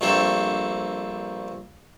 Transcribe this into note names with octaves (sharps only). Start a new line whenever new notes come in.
A#1 G2 A3 A#3 C4 A4